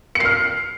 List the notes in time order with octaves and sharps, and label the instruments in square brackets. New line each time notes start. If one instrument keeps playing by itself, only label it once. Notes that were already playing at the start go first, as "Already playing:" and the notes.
[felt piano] C#7
C7
F6